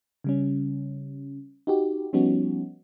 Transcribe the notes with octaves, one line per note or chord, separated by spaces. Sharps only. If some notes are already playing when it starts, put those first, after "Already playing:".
C#3 G3 C#4
D#4 F#4 G4
F3 G3 B3 C#4 D#4 F#4